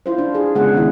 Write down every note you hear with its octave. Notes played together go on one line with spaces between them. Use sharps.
E4 F4 C5
D4
G#4
C#3 G#3 B3 G#4 F#5
D#3 D4 E4